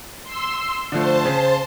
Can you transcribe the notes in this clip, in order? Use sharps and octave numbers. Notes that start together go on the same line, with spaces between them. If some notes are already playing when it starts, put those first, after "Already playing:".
C6 E6
D3 F3 A3 C5 A5 C6
C#3